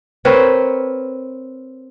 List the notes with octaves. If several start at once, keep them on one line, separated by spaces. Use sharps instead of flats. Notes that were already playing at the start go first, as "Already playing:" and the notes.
C4 A#4 B4 C#5